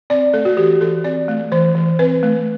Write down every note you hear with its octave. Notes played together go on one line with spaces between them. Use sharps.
C4 D5
A3 A4
F#4
E3 G4
E3 A4
C4 D5
A3
E3 C5
E3
C4 B4
A3